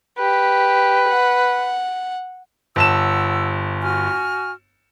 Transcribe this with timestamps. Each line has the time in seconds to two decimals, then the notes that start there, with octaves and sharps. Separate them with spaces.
0.18 G4 B4
1.09 F#5
2.76 G1 F#5 A5 E6 E7
3.82 F#4 G#5 F6